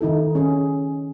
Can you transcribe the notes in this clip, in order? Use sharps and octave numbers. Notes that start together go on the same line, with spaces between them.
D#3 D#4 E4 A4
C#4 G#4